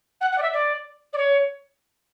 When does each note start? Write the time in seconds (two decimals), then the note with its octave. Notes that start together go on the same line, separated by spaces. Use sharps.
0.21 F#5
0.32 F#5
0.38 D5
0.42 E5
0.53 D5
1.13 D5
1.17 C#5